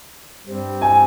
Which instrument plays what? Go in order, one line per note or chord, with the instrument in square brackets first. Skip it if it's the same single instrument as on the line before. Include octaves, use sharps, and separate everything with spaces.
[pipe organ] G2 G3 C4
[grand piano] G#5